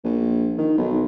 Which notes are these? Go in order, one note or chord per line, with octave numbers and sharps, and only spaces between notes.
A#1
D#3
B1